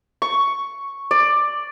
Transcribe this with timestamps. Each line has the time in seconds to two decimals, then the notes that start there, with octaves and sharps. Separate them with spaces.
0.22 C#6
1.11 D5